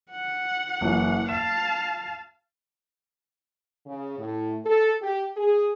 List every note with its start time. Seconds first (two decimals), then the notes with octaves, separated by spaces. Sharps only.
0.11 F#5
0.81 F#1 E3
1.29 F5 A5 E7
3.86 C#3
4.18 A2
4.65 A4
5.01 G4
5.37 G#4